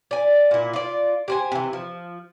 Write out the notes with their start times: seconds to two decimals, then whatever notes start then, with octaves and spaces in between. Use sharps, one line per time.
0.11 D5 G#5
0.51 A#2 E4
0.73 F4 D5
1.28 G4 C5 G#5
1.52 C3 E3
1.73 F3